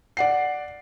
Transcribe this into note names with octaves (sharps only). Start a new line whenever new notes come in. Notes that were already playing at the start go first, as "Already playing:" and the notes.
D5 F#5 C7